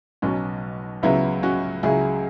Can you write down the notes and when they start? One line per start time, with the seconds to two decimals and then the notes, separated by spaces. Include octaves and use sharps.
0.22 B1 B2 F#3 C#4
1.03 C#2 C#3 F#3 B3 E4
1.43 C#4 F#4
1.83 C#2 C#3 F#3 E4 G#4